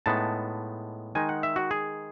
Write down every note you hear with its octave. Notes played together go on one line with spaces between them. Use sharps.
A2 G#3 B3 D#4 A5
D#3 G#3 D#4 G#5
F#5
E5
F#4
G#4